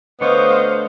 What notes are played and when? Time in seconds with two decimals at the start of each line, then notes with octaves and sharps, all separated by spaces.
0.21 D3 A3 B3 C5 C#5 D#5 F5